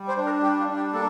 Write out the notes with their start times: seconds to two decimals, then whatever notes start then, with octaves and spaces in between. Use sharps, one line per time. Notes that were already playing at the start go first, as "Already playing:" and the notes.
Already playing: G3
0.08 C5
0.17 D4
0.25 A#4
0.42 G3 G4
0.60 F4
0.68 D4
0.77 G4
0.94 A#3 A4